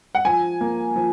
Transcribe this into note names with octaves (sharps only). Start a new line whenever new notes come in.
F#5
F3 G#5
A#3
F3